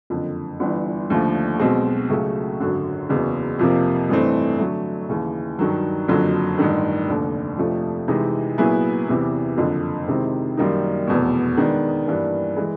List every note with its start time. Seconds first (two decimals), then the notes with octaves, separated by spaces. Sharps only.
0.10 F#1 F2 D3
0.60 G1 G2 E3
1.10 D#2 D3 F3 A3
1.59 B1 B2 G#3 C4
2.10 C#2 C#3 F#3 A3
2.60 G#1 F#2 D3 F#3
3.09 F#1 E2 C#3 F#3
3.59 F2 C3 F3 A#3
4.09 A1 G2 E3 A3 C4
4.58 D3 F#3 A3
5.09 D#2 C#3 E3
5.59 G2 D#3 F#3
6.08 F#1 F2 D3 F#3
6.59 A1 G2 D#3
7.09 F1 D#2 D3
7.58 F2 C3 F3 A3 D4
8.08 C3 E3 G#3 C4 D#4
8.58 A#2 F#3 B3 E4 G#4
9.08 E2 C3 E3
9.58 F#1 F2 D3
10.07 C3 D#3 G#3 C4 E4
10.57 F#2 D#3 G3 A#3 D#4
11.07 F1 E2 B2
11.57 D#3 G#3 B3 D4
12.07 G2 E3 G3 A#3 D4
12.57 E3 G#3